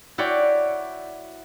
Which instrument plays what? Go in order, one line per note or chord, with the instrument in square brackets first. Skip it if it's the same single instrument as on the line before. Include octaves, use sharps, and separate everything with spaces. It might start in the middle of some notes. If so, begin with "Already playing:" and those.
[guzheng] E4 F#4 C#5 D5 G5